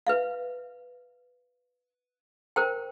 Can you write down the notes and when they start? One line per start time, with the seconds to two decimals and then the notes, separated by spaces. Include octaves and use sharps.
0.07 B4 E5 F5
2.56 A#4 C5 G5